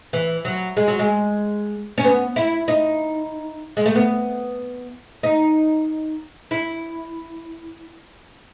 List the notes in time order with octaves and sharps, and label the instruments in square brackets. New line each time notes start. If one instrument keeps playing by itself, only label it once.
[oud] E3
F#3
G#3
F#3
G#3
C#4
B3
E4
D#4
G#3
A3
B3
D#4
E4